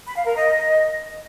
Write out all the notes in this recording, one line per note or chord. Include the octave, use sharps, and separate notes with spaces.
B5
F5
A#4
D#5